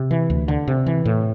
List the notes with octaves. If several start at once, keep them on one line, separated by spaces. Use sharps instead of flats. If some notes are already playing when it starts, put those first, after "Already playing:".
Already playing: C3
E3
D2
D3
C3
E3
A2